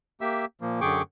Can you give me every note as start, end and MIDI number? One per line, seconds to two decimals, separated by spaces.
0.21 0.45 58
0.21 0.45 67
0.21 0.45 76
0.21 0.45 88
0.61 0.80 46
0.61 0.80 53
0.61 0.80 58
0.81 1.02 42
0.81 1.02 50
0.81 1.02 68
0.81 1.02 79
0.81 1.02 85
0.81 1.02 86